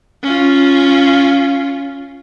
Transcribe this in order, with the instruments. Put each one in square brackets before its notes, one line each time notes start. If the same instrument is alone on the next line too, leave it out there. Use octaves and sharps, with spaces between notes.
[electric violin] C#4 F4